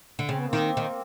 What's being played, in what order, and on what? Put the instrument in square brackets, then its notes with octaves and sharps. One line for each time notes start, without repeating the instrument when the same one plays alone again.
[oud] D3
[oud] C#3 [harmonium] C4
[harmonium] B3
A#3 C4
[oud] D#3
D#3